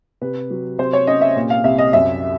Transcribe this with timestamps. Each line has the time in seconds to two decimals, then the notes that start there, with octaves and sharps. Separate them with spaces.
0.21 C3 B4
0.50 F#3
0.79 C3 C5
0.93 C#5
1.07 C#4 D#5
1.21 E5
1.36 A#2
1.50 F5
1.64 C2 E5
1.78 D#5
1.93 F#2 E5